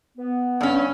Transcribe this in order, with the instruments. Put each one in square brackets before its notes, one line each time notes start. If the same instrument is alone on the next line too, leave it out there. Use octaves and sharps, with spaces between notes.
[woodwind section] B3
[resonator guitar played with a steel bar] G2 C#4